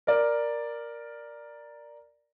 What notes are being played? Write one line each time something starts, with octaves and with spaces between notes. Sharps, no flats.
A#4 D5